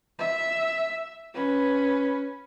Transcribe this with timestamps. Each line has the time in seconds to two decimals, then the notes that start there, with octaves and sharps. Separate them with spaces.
0.19 E5
1.34 C#4 B4